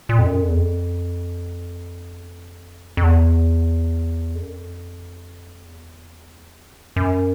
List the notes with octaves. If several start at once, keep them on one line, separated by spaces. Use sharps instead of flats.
A#2
F2
F#2
F2
E2
F2
F2
E2
F2
F#2
F2
E2
F#2